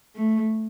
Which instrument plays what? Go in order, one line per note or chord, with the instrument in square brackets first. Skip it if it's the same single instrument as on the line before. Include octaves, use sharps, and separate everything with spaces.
[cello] A3